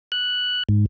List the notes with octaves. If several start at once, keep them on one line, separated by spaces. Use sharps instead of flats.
F#6
G#2